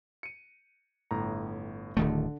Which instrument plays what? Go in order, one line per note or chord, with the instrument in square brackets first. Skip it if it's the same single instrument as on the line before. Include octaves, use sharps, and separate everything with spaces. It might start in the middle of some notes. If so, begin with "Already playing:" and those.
[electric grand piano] C#7 D#7
G1 A2 A#5
[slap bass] D1 D#3 A3 [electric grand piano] D3